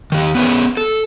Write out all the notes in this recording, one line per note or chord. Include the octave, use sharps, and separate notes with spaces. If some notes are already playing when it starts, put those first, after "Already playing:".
D#3 G4
B3 C#4 G#4 B4
A4